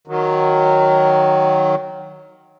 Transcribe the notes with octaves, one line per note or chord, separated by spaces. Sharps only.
D#3 F#3